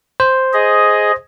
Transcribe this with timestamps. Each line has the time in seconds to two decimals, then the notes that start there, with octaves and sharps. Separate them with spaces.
0.20 C5
0.54 G#4 D#5